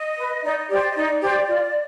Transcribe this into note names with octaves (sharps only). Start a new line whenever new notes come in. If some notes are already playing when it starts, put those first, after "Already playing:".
Already playing: D#5
B4
D#4 D5
D#5
G4 C5 D5
D#5
D#4 D5
G4 C5
F4